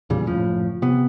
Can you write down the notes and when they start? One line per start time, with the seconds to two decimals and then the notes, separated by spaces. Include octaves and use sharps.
0.10 E2 A#2 C#3 G3
0.26 F#1 A2 F3
0.82 C3 B3